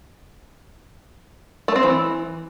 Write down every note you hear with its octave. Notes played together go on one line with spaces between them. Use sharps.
A3
C4
E3